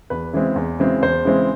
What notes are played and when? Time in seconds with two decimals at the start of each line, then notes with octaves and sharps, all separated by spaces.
0.10 E2 B4
0.33 C#3 E3 G#3 C4
0.56 E2
0.79 C#3 E3 G#3 C4
1.02 E2 C5
1.25 C#3 E3 G#3 C4